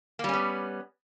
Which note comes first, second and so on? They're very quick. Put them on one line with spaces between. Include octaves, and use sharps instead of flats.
A#3 G3 C#4 B3